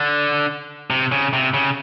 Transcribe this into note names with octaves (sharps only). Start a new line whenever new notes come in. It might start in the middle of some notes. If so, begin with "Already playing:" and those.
Already playing: D3
C3
C#3
C3
C#3